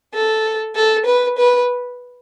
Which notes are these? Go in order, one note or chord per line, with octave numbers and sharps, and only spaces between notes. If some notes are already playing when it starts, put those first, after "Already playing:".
A4
A4
B4
B4